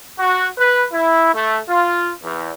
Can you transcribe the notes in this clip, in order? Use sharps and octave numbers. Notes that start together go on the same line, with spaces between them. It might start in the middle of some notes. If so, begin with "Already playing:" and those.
F#4
B4
E4
A3
F4
E2